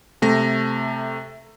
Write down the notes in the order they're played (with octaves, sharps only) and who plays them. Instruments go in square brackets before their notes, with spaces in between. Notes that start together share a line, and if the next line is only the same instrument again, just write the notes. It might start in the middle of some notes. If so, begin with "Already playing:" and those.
[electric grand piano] C3 A3 A#6